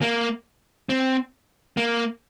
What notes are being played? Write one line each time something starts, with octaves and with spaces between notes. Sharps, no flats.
A#3
C4
A#3